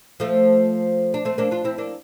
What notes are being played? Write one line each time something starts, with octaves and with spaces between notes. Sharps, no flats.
F3 A3
D4
A3 C4
A#3 D4
D4 F4
C4 E4
A#3 D4